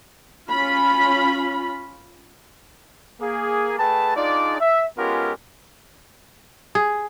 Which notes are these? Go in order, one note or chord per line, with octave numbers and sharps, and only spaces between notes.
C#4 F4 B5
A#3 G#4
A3 G#4 B4 G5 A5
D4 D#4 F4 G#4 D5
E5
G#3 B3 C#4 F4 G4 A#4
G#4